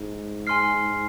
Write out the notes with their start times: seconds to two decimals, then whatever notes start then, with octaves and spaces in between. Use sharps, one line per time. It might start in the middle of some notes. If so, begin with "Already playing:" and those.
Already playing: G#2
0.47 G#5 C6 F6 C7